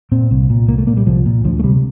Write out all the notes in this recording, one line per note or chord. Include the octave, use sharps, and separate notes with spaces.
A#2 C4
C2
A#2
C2 A#3
A3
A#2 A#3
G3
C2 F3
A#2
D2 F3
A3
C3 G3